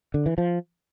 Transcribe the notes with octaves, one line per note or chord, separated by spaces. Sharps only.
D3
E3
F3